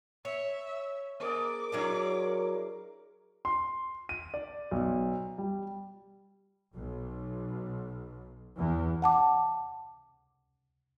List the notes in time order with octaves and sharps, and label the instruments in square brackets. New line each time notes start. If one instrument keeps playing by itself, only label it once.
[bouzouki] C#5 [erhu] E5
[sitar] A#3 G#4 D5 [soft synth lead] A#4 [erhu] D6
[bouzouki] F#3 C#4 D5 [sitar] D4 E4 G#4
[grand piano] C6
D#7
D5
B1
G3
[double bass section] B1
E2
[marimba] F#5 A5 D6